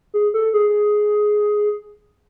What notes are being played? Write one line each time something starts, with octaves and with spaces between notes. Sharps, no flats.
G#4
A4
G#4